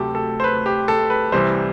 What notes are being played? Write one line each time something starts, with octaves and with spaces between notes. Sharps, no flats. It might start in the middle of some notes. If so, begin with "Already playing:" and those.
Already playing: D2 C3 F#3 A3 G4 A4
A4
C5
B4
G4
A4
B4
C2 C3 E3 G3 C5